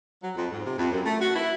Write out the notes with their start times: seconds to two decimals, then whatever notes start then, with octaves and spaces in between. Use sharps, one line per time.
0.24 F#3
0.36 F2
0.52 G#2
0.66 C3
0.78 F2
0.92 F#2
1.06 A3
1.21 F#4
1.36 E4